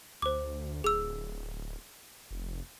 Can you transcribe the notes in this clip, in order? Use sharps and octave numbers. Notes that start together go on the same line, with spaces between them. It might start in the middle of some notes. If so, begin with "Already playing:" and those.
D2 C5 D6
D1 G#4 E6
F1